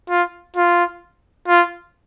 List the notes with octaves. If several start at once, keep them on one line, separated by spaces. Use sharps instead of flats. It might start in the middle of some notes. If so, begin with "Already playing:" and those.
F4
F4
F4